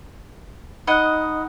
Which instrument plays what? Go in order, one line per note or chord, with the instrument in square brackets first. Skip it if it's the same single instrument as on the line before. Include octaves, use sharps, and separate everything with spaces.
[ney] D#4 [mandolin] D#5 F#5 [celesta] B5 F#6